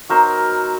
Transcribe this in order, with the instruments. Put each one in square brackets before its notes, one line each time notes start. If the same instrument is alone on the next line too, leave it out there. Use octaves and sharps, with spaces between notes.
[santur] F#3 B3 D#4 A#4 C5